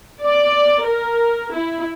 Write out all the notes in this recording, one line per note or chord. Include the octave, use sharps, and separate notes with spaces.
D5
A#4
E4